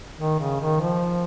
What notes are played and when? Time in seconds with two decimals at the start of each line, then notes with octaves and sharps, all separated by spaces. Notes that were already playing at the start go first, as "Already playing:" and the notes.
0.18 D#3
0.39 C#3
0.60 D#3
0.81 F3